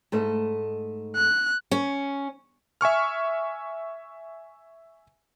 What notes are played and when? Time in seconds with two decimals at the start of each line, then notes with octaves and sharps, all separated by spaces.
0.12 G#2 A3 D#5
1.16 F#6
1.71 C#4
2.81 E5 G#5 C#6 F6